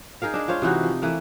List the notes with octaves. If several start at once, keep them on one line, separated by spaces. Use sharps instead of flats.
D#4 G#4 A#4 F5
G#3 D4
F4 C5 C#5 F5
C3 E3 D#4 F#4
F3
E3 A3 A#3